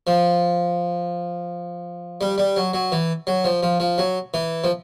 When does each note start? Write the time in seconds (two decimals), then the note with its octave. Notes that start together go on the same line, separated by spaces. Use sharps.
0.07 F3
2.21 G3
2.38 G3
2.56 F#3
2.74 F#3
2.92 E3
3.27 F#3
3.44 F3
3.63 F3
3.80 F3
3.98 F#3
4.34 E3
4.64 F3